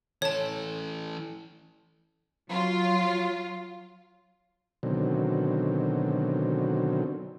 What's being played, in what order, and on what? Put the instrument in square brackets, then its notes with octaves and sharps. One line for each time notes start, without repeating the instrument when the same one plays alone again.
[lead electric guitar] E3 A4 [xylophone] C#5 A5
[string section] F#3 F4
[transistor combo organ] B2 D3 D#3 F#3 C4